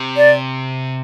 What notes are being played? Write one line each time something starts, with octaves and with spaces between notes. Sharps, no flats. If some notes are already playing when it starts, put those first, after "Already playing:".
Already playing: C3
D5